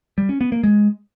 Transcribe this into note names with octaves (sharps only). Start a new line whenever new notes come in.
G3
C#4
B3
A#3
G#3